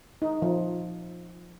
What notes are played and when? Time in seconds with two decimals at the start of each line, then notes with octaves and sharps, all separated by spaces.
0.22 D#4
0.42 F3